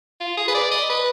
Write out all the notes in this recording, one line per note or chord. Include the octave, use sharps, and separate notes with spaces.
F4
G#4
B4
D5
D#5
B4